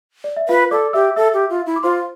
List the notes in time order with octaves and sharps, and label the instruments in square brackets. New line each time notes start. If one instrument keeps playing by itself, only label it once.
[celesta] D5
E5
[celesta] F4 F5 [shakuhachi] B4
[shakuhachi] A4 [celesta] D5 D6
[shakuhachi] G4 [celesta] E5 E6
[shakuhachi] A4 [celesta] E5 E6
[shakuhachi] G4
F4
E4
[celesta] D6
[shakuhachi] F4 [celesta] C5 C6